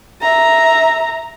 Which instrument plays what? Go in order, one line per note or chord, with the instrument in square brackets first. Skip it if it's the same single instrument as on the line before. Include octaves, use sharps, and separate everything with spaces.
[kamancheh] E5 A#5